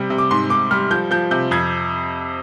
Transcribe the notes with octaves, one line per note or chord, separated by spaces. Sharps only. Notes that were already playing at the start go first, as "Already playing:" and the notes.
Already playing: C3 G3
C3
D6
G#2 C6
G#2 D6
G3 F6
F3 G6
F3 G6
C3 G6
F2 G#6